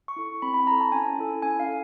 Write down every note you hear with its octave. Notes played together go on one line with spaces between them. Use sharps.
C#6
E4 A4
C4 B5
B5
E4 A4 A#5
A5
C#4 G#5
E4 A4
C#4 G#5
F5
A4